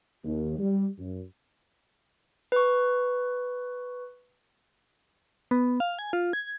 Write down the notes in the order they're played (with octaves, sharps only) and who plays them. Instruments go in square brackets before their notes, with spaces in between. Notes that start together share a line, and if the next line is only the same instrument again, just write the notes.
[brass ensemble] D#2
G3
F#2
[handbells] B4 C#6
[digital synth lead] B3
F5
G#5
F4
G#6